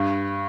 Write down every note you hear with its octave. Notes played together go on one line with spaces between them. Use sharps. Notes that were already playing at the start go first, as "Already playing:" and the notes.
Already playing: G2